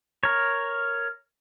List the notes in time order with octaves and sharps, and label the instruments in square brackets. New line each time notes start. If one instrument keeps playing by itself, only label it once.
[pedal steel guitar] A#4 C#5